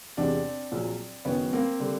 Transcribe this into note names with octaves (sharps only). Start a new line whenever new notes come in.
E1 E2 C3 E3 G#3 C4 D4
A#1 A#2 F#3
F#1 F#2 D#3 B3 C#4
A#3 C4
D3 G3